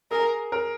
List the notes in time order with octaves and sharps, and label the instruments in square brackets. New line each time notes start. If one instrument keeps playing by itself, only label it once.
[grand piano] G#4 [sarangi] A#4
[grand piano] A#4